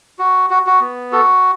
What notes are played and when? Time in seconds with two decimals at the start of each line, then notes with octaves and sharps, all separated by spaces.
0.19 F#4
0.50 F#4
0.66 F#4
0.81 B3
1.12 F#4 A4